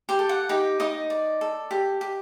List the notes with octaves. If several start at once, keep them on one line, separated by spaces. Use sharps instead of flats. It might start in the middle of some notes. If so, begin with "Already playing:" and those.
G4 G5
A4
F#5
D#4 G4 G5
D#4 D#5 D#6
D5
A4
G4
G4